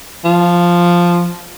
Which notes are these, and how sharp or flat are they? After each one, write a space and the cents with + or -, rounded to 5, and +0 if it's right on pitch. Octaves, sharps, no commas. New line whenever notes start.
F3 +0